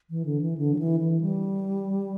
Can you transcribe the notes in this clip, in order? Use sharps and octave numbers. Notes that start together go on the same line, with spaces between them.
E3
D3
E3
D3
F#3
E3
E3
G3